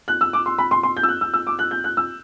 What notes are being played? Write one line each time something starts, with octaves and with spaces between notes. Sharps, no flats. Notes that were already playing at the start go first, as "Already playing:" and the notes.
F#6
E6
D6
C6
B5
C6
C6
G6
E6
F#6
E6
E6
D6
F#6
G6
F#6
E6